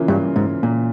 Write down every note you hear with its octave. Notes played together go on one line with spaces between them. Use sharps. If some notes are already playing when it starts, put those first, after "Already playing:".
Already playing: C#3 E3 A#3 F4
G2
G#2
A#2